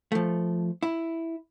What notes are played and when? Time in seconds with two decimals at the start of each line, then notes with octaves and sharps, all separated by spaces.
0.12 F3 A3
0.83 E4